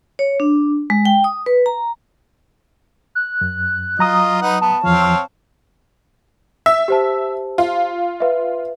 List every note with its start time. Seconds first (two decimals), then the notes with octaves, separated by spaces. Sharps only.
0.19 C#5
0.40 D4
0.90 G#3
1.05 G5
1.24 D#6
1.46 B4
1.66 A#5
3.15 F#6
3.41 F#2
3.99 F#3 F4 D#5 A#5 D#6
4.42 D#4 B4 F#5
4.61 B3 A5
4.84 E2 F3 C4 C#5 F5
6.66 E5 E6
6.88 G4 C5 A5
7.58 F4
8.20 B4 E5